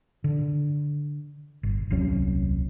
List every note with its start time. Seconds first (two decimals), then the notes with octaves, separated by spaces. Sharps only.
0.24 D3
1.63 G1
1.90 D#1 C2 F#3 C#4